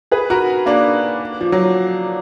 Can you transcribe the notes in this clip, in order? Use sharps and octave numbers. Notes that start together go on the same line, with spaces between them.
G#4 B4
F#4 A#4
A#3 D4
F3
F#3